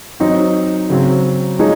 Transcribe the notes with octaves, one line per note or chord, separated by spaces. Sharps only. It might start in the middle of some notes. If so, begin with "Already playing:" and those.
F#3 C4 D#4
C#3 F#3 C4
F3 G#3 D#4 G#4 C#5